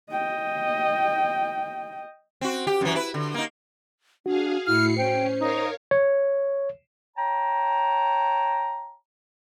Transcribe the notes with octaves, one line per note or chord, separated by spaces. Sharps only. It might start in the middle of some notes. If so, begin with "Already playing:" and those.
D#5 G5
C4 F#4
G4
F#2 E3
E4 B4
D3
A#3 D#4
D4 F#4 G#4 F5
A2 E4 F6 C7 C#7
C#4 C5 G5
D#4 A#4 C#5 F5
C#5
C#5 G5 A5 A#5